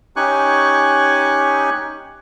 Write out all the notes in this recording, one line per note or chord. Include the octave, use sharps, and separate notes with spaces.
C#4 D#4 G4 G#5 C#6 F#6